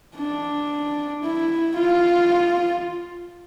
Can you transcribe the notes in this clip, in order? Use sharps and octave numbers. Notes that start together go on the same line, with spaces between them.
D4
E4
F4